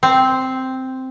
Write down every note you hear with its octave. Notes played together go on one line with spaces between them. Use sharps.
C4